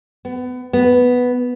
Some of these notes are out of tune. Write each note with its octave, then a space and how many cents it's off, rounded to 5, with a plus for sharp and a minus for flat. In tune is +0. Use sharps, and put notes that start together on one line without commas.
B3 +25
B3 +0